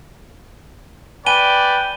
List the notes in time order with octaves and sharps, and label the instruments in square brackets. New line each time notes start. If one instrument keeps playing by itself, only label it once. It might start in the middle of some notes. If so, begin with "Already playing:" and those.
[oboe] B4 [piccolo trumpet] D5 [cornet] G5 [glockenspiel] G#5 D#7 G7